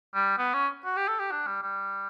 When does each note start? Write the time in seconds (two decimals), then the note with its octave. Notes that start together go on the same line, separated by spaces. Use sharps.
0.15 G3
0.38 B3
0.53 C#4
0.85 F#4
0.96 G4
1.08 A4
1.19 G4
1.31 D4
1.47 G3
1.62 G3